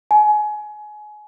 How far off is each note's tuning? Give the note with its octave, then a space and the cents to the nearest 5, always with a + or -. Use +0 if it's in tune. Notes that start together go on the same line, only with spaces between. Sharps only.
G#5 +25